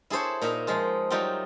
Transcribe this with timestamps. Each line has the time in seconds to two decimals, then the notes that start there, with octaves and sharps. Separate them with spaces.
0.10 E4 G#4 A4 C5 C#5
0.42 A#2 D#4 A#4 E5
0.67 F3 G#3 F4
1.10 F#3 G3 D#4 F4 E5 G5